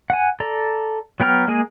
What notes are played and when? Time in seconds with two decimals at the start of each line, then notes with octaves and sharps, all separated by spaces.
0.10 F#5 G#5
0.40 A4 D5 A#5
1.20 F#3 B3 G5 A#5 F6
1.48 G#3 A#3 G#4 G#5